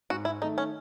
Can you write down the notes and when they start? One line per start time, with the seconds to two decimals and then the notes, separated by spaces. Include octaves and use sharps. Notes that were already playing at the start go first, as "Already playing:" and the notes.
0.10 G#2 F#4
0.25 E4
0.42 D#3 A3 D#4
0.58 C#4